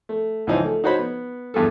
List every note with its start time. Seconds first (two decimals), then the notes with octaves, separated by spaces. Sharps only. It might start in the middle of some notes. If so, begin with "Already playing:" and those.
0.09 A3
0.47 C#2 E3 F3 D#4 C5 G#5
0.65 A3
0.84 D#4 F#4 C5 C#5 B5
0.99 B3
1.54 E2 G2 G#4 A4